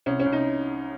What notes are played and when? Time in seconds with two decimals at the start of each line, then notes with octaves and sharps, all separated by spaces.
0.06 C2 C#4
0.19 C#4
0.26 C2
0.32 D#4